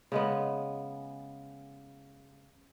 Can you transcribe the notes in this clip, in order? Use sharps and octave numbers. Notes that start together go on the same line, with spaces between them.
C#3 G#3 B3